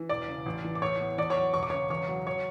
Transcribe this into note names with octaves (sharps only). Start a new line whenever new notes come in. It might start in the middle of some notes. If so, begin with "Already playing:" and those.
Already playing: E3
E1 D5 D6
C#3
A1
E3
D6
A2 C#5 C#6
B3
E2 D5 D6
C#5 C#6
F#3
E1 C#6
D6
C#3 C#5 C#6
E2 C#5 C#6
F#3
C#5 C#6